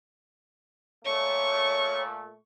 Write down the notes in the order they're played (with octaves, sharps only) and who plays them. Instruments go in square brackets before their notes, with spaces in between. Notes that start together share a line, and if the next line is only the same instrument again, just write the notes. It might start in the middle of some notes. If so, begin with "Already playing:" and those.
[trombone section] A#2 A3 [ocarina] C#5 [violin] C#6